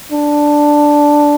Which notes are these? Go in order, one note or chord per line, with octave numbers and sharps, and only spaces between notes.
D4